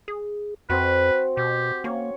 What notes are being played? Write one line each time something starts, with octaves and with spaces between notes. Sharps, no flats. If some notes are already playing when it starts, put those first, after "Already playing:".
G#4
F2 C4 F#4 B4
B2 G4
A#3 C#4 C#5